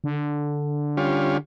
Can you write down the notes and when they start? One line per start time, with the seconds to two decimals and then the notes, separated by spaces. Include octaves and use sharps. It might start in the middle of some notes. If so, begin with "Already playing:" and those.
0.04 D3
0.97 G3 C#4 F4